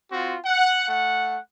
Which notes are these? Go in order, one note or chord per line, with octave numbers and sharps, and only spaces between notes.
C4 F4 F#4
F#5
A3 F#5